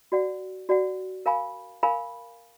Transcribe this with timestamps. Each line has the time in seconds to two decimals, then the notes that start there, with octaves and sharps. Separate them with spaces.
0.12 F#4 D5 F#5
0.69 F#4 D5 F#5
1.26 A#4 F5 G#5 B5
1.83 A#4 F5 G#5 B5